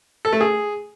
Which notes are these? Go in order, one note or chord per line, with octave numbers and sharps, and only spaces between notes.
A4
A3
G#4